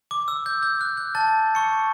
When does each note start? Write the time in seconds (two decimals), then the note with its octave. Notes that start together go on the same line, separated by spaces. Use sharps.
0.11 D6
0.28 E6
0.46 G6
0.63 G6
0.81 F#6
0.97 G6
1.15 A5 A6
1.55 C#6 C#7